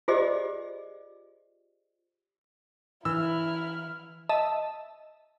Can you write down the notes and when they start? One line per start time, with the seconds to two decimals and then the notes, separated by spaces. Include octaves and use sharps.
0.08 F4 G4 G#4 C5 D5 D#5
3.05 E3 E4 E6 F6
4.29 D#5 E5 A5